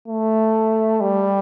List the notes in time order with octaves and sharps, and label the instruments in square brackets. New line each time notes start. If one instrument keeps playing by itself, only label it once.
[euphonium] A3
G3